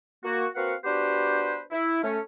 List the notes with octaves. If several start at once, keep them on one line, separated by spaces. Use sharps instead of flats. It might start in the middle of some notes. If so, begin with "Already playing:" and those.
A#3 F#4
A#3 C4 F#4 B4 F5 F#5
B3 D4 F#4 G4 B4 C5
E4
A3 C#4